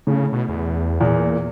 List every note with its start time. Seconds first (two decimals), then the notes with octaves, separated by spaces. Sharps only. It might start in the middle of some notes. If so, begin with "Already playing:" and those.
0.07 A2 C#3
0.33 B2
0.49 E2
1.01 E2 A#2